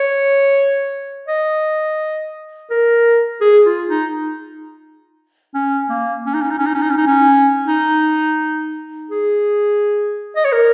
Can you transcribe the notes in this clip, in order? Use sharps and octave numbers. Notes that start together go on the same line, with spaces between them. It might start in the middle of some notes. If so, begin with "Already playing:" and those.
Already playing: C#5
D#5
A#4
G#4
F4
D#4
C#4
A#3
C#4
D#4
C#4
D#4
C#4
D#4
C#4
D#4
C#4
D#4
C#4
D#4
G#4
D#5
C#5
A#4